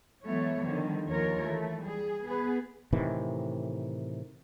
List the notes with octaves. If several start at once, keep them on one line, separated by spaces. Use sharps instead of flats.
E3 F#3 G#3 A3 B3 C#5
D3 D#3 F3 G3
D#2 F3 F4 A#4 C#5
E3 A3
G3 G#4
B3 G#4 B4
A2 C3 D#3 E3